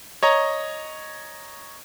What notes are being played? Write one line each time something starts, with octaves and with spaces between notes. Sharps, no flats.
C#5 D#5 A#5